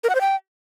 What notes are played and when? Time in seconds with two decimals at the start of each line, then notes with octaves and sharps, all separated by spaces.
0.04 A#4
0.09 F#5
0.15 C5
0.21 G5